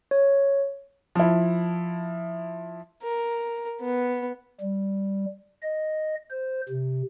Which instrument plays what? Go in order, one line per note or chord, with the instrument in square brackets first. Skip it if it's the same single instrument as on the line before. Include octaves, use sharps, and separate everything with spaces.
[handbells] C#5
[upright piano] F3 E4
[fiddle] A#4
B3
[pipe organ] G3
D#5
C5
C3